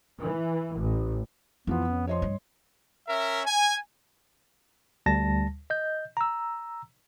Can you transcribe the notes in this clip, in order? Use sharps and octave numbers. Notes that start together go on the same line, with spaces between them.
E3
A1
F2 E3 F3 B3 F4
C#4
F3 C#5 D#5 C6
G2
C#4 A#4 E5
G#5
D2 G3 A5 A#6
D#5 G6
A#5 E6